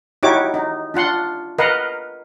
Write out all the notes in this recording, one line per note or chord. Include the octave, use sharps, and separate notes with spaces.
D#4 E4 F#4 G4 C#5 D6
D#4
D4 F4 F#5 C6
A#4 B4 D#5 F5 F#5